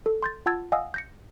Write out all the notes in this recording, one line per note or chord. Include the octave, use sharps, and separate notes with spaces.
A4
C6 G6 A6
F4 F#5 A5 E6 G#6 A6
D#5 F5 F#5 G#5 D#6 E6
G6 A#6 C#7